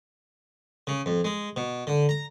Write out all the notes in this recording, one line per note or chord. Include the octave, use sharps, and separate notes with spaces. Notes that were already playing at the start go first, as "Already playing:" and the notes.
C#3
F2
G#3
B2
D3
A#5